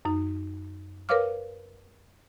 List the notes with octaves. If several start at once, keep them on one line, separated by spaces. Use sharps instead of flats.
F#2 D#4
A#4 B4 C#5 F5 D6 F6